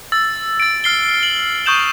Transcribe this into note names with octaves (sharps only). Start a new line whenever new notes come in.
E6 A6
A6 D7
F6 C7 G7
F#7
C#6 D#6 G6 E7 F#7